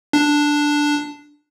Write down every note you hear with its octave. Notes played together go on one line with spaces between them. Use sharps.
D4